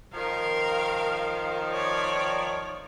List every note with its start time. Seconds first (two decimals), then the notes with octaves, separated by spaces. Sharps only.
0.14 D#3 F3 A#4 F5
1.71 C#5 D5